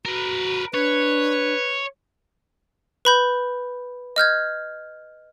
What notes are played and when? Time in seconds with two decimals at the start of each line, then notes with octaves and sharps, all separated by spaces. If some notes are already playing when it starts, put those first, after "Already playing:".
0.05 F#4 A#4 B4
0.74 D4 B4 C#5
3.05 B4 B5 G6
4.16 D#5 F6 G6 G#6